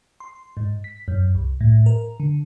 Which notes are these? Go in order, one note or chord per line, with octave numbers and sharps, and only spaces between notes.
C6
G#2
B6
F#2
C2
A2
A#4
D3